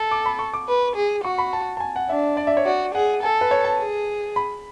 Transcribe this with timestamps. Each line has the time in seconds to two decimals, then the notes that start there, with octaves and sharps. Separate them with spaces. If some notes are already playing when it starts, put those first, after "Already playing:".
Already playing: A4
0.11 D6
0.26 B5
0.39 C#6
0.54 D6
0.68 B4
0.96 G#4
1.24 F#4 C#6
1.38 B5
1.53 A5
1.77 A5
1.80 G#5
1.96 F#5
2.09 D4 E5
2.37 D5
2.47 E5
2.57 C#5
2.66 F#4 D5
2.94 G#4 F#5
3.23 A4 G#5
3.41 B4
3.51 C#5
3.65 A5
3.79 G#4
4.36 B5